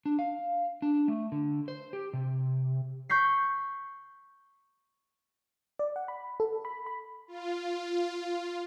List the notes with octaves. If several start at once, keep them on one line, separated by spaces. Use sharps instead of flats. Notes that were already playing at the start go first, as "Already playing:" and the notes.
D4
F5
D4
A3
D3
C5
G4
C3
C#6 G6 B6 C7
D5
F#5
B5
A4
B5
B5
F4